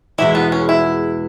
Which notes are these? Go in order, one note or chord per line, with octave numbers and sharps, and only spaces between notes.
E2 B2 G#3 E4
B3
C#4
E4